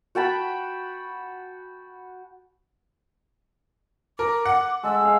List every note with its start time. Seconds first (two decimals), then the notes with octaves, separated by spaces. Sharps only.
0.15 F#4 G5 A5 B5
4.19 A#4 D6
4.45 F#5
4.83 G#3 A4 E6
5.01 G#4 F5